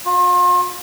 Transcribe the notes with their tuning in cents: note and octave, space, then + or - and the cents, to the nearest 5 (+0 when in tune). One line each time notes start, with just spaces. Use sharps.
F4 +40